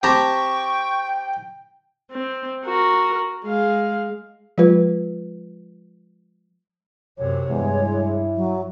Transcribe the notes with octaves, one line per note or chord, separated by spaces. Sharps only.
C4 G4 G5 A5 A#5 C#6
C4
F#4 A#4
G#3 F5
F3 G#3 F4 B4
F#2 C3 C#5
E2 G2 G#3
E4
F#3